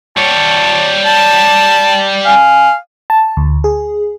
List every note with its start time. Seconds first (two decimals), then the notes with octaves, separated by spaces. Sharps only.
0.17 G3 C#5 A5
1.05 A5
2.25 F5 G#5
3.10 A5
3.37 D2
3.64 G#4